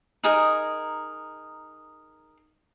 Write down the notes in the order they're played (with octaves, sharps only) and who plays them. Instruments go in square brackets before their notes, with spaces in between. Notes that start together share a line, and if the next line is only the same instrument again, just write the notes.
[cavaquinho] D#4 G#4 A#4